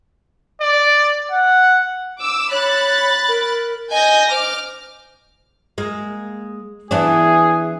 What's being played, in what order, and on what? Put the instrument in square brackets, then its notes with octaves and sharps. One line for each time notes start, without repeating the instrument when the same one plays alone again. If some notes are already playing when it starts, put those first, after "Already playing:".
[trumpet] D5
F#5
[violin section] D6 E6
[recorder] C#5 [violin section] B5 F#6 A6
[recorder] A#4
[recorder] D#5 [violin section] G#5 G6 A#6
[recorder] C5 [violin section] D6 F6
[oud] G#3 A#3
[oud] E3 B3 D4 [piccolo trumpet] G#4